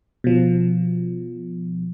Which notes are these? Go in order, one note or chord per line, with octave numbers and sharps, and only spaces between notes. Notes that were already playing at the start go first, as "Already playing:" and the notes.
B2 F3